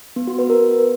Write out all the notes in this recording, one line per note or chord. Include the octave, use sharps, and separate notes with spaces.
B3
F#4
B4
A#4